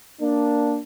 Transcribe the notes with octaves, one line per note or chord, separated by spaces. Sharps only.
A#3 D4